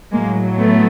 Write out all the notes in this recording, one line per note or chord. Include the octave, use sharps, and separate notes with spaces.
A2 F#3 G#3 A#3
A3 B3